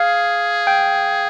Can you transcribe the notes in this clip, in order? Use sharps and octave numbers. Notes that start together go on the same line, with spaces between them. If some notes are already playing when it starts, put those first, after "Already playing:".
Already playing: G#4 F5
G5